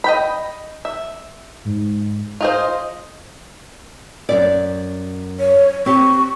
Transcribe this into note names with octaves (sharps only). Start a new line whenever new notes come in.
D#5 G5 B5
E5
G#2
F4 G#4 C5 D#5
F#2 A#2 D5
C#5
C4 G4 C#6